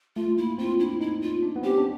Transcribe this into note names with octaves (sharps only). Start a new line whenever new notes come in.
A3 F4
A#3 E4
C4 F4
D4 E4
D#4 E4
F4
D4
B3
C4 G4
C#4
D4